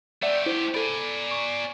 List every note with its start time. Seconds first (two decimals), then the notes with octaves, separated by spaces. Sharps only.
0.22 A3 G4 D5 E5 F#5
0.46 E4 C5
0.74 A4 D5 G#5 B5
1.31 C#6